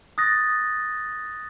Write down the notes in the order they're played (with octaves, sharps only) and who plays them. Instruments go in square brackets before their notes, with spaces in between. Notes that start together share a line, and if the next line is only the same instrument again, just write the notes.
[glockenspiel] D#6 F#6 A6 A#6